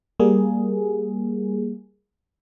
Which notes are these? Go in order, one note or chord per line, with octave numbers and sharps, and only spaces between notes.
G3 A#3 G#4